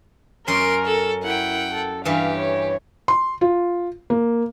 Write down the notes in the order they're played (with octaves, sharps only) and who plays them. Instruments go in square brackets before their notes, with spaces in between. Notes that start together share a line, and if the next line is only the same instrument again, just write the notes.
[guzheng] F#2 C#4 [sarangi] A#4 [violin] C6 D7
[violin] A4
[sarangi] E4 [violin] F#5 G5
[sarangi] A4
[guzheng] G2 E3 [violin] G4 [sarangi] F5
[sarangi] C#5
[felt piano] C6
F4
A#3